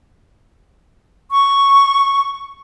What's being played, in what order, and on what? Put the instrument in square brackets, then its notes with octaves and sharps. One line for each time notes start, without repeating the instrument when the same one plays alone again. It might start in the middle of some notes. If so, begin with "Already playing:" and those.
[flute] C#6